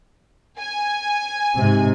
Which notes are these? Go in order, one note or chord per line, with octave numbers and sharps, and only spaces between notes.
G#5
G#2 C3